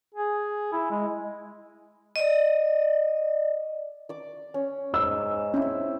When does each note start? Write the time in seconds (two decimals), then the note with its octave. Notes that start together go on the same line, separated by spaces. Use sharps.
0.15 G#4
0.72 E4
0.91 G#3
2.16 D5 D#5
4.09 D5 D6
4.54 C#4
4.94 G#2 E6
5.54 C4 C#4 E4